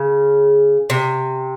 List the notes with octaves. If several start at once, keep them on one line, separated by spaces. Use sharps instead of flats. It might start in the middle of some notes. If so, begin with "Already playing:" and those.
Already playing: C#3
C3